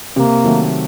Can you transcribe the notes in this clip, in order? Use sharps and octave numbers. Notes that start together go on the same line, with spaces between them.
C3 A#3
D#3 F#3 A3